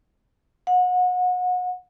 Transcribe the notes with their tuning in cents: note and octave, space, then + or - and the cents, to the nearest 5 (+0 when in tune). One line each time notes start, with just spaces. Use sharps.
F#5 -30